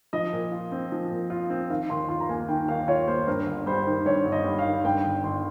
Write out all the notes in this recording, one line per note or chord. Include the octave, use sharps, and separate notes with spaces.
F3 D#5
A#2
F4
C4
F3
A#2
F4
C4
D#3 F5
D#2 C6
F4 C6
A#5
A#3 G#5
D#3 G5
D#2 F5
F4 C#5
A#3 C5
G2 A#4
G1
G3 C5
D#3
G2 C#5
G1
D#5
G3
F5
D#3
G2 G5
G1
G1 C6